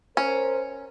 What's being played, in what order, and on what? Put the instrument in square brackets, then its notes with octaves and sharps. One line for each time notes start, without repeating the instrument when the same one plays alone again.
[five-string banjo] C#4 [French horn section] A#4 C5